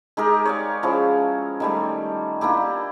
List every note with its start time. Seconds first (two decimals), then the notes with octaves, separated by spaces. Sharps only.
0.17 G#3 D#4 G4 A#4
0.45 C#5 D5 F5
0.83 F3 C#4 E4 G#4
1.60 D#3 G3 A3
2.41 A#3 D4 E4 G4